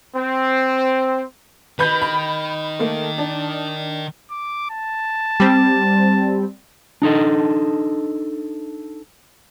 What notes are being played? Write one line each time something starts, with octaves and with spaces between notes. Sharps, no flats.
C4
D#3 B4 B5 G6
B5
A3 A#3
D4
D6
A5
G3 C4
D4 D#4 A4 D#5